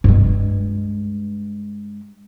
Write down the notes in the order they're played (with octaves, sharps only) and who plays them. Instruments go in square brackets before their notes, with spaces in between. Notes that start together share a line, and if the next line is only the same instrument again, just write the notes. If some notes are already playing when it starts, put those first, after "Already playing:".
[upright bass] G2 G#3